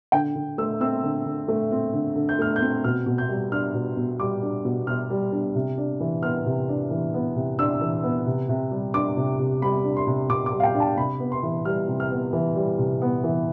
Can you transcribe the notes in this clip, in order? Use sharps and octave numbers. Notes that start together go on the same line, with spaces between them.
D3 G5
D3
A3 E6
C4 E6
D3
D3
A3
C4
D3
D3
G6
A3 F6
G6
C4
B2 F6
B2
G6
G3
D4 F6
B2
B2
G3 D6
D4
B2
B2 F6
G3
D4
C3
D4
E3
B3 F6
C3
D4
E3
B3
C3
D4 E6
E3
B3
C3
C3
G3
D4 D6
C3
C3
G3 B5
D4
C6
C3
C3 D6
D6
G3
F5
G5
D4
A5
C3 B5
B3
C6
E3
G3 F6
C3
F6
B3
E3
G3
C3
B3
E3